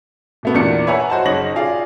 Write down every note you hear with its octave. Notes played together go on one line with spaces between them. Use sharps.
B2 A3 B3
E2 A#2 D4 A#4 C#7
B4 C#5 E5 F#5 G#5 A#5
F#4 C5 D#5 A5
F#1 D#4 C#5 A#6 F#7
F4 G#4 D5 F5